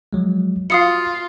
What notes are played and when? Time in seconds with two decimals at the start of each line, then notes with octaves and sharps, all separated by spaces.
0.13 F3 F#3 G#3
0.70 F4 F#4 F5 D#6 C#7